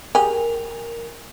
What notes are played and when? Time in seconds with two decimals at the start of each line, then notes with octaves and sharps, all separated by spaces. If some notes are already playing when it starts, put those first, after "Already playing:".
0.15 G4 G#4 A#4